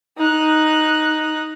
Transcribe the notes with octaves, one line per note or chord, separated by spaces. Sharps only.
D#4 F#6